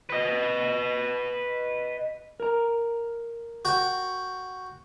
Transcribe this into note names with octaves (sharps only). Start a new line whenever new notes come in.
B4 D#5
A#4 A#5
F#4 G5